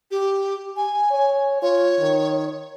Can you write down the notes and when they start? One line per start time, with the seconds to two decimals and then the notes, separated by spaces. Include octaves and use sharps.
0.11 G4
0.77 G#5
1.10 C#5
1.62 F4 C#5
2.00 D#3